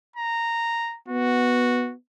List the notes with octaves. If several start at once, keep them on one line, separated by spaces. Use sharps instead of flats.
A#5
B3 F#4